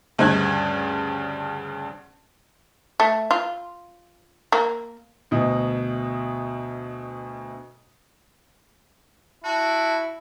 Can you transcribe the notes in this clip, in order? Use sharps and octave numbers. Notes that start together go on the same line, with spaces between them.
D2 G2 C#3 C5 F#6 G#6
A3
F4
A#3
D2 B2 D#5
E4 F#4 A5